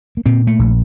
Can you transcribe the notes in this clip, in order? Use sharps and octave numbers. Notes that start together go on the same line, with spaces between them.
A#3
A#2 C4
A3
A#1